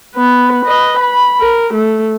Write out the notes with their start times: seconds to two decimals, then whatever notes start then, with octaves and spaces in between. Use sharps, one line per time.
0.15 B3 B4
0.65 B4 D#5
0.99 B5
1.40 A#4
1.74 A3